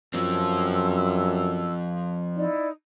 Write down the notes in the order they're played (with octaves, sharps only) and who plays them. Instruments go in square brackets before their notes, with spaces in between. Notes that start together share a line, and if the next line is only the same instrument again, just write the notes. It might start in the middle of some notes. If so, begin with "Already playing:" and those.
[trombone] F#2 [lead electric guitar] F3 C4 [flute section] E6
[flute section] D#4 E4 D5